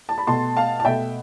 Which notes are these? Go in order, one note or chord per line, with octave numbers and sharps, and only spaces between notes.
A5
B5
B2 A3 A5 C6
F5 A5
A5
B2 A3 E5 G5